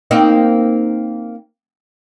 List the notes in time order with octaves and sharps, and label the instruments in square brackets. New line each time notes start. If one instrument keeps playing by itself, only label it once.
[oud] A#3 C4 D#4